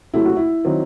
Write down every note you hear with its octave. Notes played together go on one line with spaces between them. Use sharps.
C3 F#3 A3 E4
F#4
E4
D#3 F#3 C4